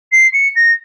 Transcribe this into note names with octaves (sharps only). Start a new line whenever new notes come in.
C7
C#7
A#6